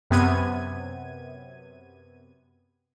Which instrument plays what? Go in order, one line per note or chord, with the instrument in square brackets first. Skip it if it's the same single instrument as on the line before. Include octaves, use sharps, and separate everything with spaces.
[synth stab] F#2 C3 B3 G#6 D#7